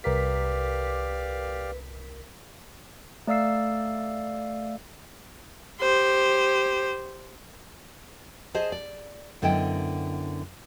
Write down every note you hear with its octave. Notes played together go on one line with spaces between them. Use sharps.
C2 G4 A#4 B4 D5 F5 B6
A3 D5 F5 E6 C7
G4 C5
G#4 C5 D#5 A5
D5
F#2 D3 B3 E4 D#5 G5